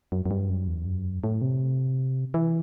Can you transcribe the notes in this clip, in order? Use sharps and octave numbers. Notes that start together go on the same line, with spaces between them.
F#2
F#2
G2
F#2
E2
F#2
A2
C3
E3